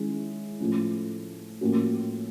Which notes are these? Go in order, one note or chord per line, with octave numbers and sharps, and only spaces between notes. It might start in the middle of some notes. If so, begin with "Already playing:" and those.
Already playing: D#3 G#3 C#4 E4 G#4
A2 F3 A3 C#4
A2 F3 A#3 C#4 F#4